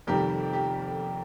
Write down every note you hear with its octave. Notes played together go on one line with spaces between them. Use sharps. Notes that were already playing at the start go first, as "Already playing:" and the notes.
F1 F2 D#3 G3 G4 A#4
G4